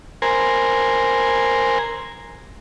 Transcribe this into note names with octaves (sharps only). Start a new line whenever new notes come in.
A#4 C5 G#5